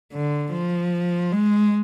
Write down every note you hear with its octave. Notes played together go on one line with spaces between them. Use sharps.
D3
F3
G#3